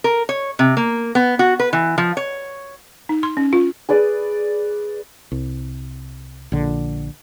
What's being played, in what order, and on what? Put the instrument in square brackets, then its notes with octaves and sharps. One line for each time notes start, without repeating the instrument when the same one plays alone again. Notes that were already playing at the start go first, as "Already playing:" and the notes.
[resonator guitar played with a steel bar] A#4
C#5
C3
A#3
B3
F#4
B4
E3
F3
C#5
[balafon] D#4
C6
C#4
F4
[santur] G#4 B4 D5
[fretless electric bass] C2
A#1 D3